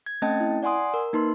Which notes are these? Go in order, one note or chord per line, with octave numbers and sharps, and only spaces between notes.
G#6
A3 C4 C#4 D#5 G5 A5
E4
D5 F#5 G#5 C6 D#6
A#4
A#3 D#4 B4 C6